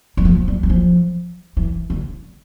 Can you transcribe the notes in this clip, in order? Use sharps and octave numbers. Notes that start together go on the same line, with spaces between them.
G3
F3
G3
G3
F3
E3
D3